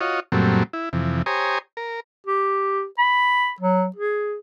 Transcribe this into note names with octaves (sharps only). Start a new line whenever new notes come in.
F4 F#4 C#5 D#5
F#2 A#2 F#3 G3 A3 C4
E4
F2 C3 E3
G4 C5 C#5 G#5 A#5 D#6
A#4
G4
B5
F#3
G#4